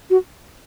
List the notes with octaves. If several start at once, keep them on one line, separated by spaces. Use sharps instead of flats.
F#4